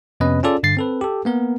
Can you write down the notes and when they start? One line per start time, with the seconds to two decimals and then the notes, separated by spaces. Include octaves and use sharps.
0.20 F2 C3 B3 C#4 B4 D#5
0.43 C#4 F4 G#4 A4 D5
0.63 G2 D3 A6 C7
0.77 C4 A4 B4
1.01 G4 A4
1.25 A#3 B3 A#4